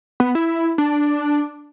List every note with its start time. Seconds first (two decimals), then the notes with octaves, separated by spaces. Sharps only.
0.20 B3
0.35 E4
0.78 D4